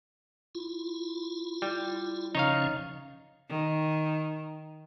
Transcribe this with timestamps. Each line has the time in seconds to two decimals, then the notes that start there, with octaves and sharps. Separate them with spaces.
0.55 E4 F4
1.62 G3
2.35 C#3 F3 C#4 D#4 C#5 F5
3.49 D#3